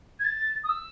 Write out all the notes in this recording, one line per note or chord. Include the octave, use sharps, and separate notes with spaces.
G#6
A6
D#6
E6